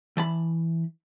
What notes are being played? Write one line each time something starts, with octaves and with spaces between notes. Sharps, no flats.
E3 A5 B5